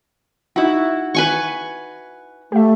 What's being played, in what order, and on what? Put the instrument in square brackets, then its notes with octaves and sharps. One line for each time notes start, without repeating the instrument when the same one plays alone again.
[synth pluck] D#4 [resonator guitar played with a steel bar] E4 F#4
[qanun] B4 G#5 C#6
[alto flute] A3 [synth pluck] G4 E5